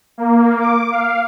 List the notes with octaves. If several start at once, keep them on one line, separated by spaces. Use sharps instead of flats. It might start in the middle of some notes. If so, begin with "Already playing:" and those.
A#3
D6
F5